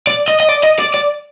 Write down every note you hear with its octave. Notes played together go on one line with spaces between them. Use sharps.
D5
D#5
D#5
D5
D#5
D5
D5